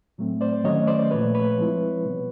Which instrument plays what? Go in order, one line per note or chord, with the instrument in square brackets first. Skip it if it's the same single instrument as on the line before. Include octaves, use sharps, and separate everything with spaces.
[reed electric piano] A2 F#3 A3 C4
C5 D5
D#3 F#3 A3 C#4 C#5 D#5
C5 D5
A#2 F3 A3 B4 C#5
B4 C#5
F3 G#3 C4 E4
B2 G3 B3